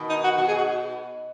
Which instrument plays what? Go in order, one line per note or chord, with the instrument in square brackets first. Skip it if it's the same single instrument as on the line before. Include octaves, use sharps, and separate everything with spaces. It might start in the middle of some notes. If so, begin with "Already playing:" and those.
Already playing: [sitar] B2 D#3
[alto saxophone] D#4
F#4
[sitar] B2 [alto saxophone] F#4
[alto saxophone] G#4
F#4